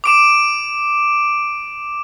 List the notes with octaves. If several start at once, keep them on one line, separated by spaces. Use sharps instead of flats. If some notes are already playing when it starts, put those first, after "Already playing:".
D6 D7 E7